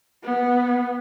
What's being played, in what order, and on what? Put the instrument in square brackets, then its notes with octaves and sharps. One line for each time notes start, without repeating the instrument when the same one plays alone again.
[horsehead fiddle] B3